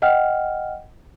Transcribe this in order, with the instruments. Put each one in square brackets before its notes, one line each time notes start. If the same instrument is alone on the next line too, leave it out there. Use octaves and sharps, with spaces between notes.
[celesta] D#5 F#5 G5 F6